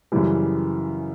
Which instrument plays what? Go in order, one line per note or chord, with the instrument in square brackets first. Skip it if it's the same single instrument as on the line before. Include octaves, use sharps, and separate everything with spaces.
[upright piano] F#2 C#3 E3 G3